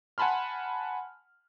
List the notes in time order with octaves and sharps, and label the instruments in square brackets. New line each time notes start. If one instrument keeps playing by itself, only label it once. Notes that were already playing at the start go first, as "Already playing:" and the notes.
[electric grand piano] F#5 G#5 A5 B5 C6 F6